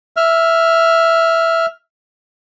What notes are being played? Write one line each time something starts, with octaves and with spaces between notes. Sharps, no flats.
E5 F6